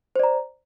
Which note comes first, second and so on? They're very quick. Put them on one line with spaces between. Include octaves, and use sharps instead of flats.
C5 D5 A#5